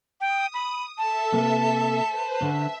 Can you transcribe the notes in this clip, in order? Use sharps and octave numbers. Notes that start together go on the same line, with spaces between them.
G5 D#6
B5
A4 E5 A5
C3 A#3 B4
B4 C5
D3 C#4 E5